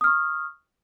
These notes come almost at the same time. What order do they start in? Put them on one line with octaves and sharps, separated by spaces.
D#6 F6 C#6